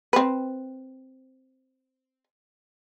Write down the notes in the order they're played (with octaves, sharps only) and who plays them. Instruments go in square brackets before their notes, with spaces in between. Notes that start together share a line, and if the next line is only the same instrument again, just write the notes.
[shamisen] C4 B4